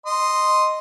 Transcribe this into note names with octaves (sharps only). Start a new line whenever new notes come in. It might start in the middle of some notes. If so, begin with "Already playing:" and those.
D#5 C6